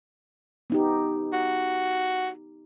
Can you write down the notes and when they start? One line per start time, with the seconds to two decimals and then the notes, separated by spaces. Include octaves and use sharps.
0.70 B3 D#4 G4
1.33 F#4